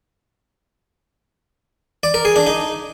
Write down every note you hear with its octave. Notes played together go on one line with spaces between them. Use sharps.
D5
A#4
G#4
D4
D#4